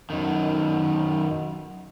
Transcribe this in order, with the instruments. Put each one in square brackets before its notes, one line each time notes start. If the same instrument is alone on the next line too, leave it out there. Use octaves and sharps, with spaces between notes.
[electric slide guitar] F#2 D#3